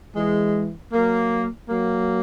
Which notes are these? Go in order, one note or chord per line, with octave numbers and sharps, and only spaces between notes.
E3 G#3
F#3 A#3
F#3 A#3